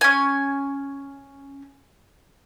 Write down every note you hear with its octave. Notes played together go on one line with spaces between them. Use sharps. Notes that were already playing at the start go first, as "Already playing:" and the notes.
C#4 G#5